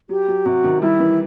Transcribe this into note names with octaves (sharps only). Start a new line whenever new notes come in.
F#3 G4
F#3
C3 F#4
D#3
G3 E4
E3